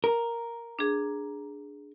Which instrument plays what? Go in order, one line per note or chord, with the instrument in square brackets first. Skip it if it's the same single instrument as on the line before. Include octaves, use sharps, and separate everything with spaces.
[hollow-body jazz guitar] A#4
[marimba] D4 G#4